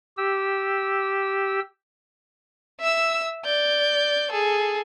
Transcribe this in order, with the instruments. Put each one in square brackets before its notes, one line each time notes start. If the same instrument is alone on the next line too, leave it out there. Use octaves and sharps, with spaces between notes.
[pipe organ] G4 E6
[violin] E5 E6
D5 G6
G#4 A4